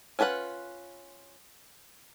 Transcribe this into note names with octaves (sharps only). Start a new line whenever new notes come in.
C#4 F4 B4 C5 F#5